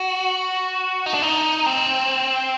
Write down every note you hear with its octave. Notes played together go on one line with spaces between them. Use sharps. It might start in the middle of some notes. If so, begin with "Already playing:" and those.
Already playing: F#4
D#4
D4
D#4
C4